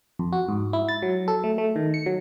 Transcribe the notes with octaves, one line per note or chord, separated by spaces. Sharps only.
F2
F#4
G#2
E4
A6
F#3
A4
A3
A3
D#3
C#7
F#3